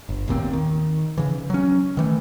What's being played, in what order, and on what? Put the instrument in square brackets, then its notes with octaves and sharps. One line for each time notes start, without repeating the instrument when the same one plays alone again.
[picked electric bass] G1
A1 D#2 A#2 C4
D#3
C#3 E3
F#3 C#4
D#3 E3 A3